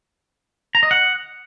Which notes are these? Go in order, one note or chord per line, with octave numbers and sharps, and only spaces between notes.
A#5
D#5
F#5